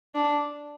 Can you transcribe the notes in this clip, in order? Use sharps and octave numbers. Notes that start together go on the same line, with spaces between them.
D4